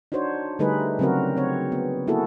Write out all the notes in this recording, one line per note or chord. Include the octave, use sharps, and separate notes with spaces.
D4 D#4 F#4 C5 C#5
D3 G3 A3 D#4 G#4 B4
C#3 F#3 C4 C#4 F#4 A#4
C4 C#5
B3
A#3 E4 F#4 G#4 A4